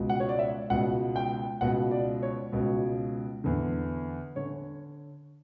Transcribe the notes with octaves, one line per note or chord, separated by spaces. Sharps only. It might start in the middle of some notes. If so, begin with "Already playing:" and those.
Already playing: C#2 B2
F#5
C#5
D5
E5
C#2 B2 F#5
G5
C#2 B2 F#5
D5
C#5
C#2 B2
E2 D3
D3 C#5